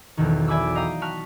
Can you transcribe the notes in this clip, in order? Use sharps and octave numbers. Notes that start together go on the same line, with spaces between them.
E1 B1 E2 D#3
D5 E5 G#5 B5 D6 E6
D#5 F5 G5 A#5 D#6
F#4 A5 F6 B6